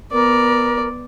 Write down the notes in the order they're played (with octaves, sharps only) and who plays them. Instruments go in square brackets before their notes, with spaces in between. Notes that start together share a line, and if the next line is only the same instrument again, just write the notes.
[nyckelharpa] B3 D5 [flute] A#4